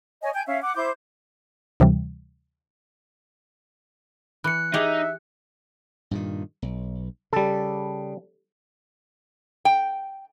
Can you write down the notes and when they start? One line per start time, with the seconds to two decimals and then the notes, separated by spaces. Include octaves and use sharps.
0.23 C#5 D#5 G#5
0.35 G5 G#5 G6
0.47 C#4 E5 F5
0.62 F#5 D6
0.75 E4 C5 D6 G6
1.80 D2 C3 E3 G3
4.44 E3 F#6 C#7
4.74 D#4 G4 G#4 E5
6.11 G2 A#2 D#3
6.62 B1
7.33 C#3 G3 A4
9.65 G5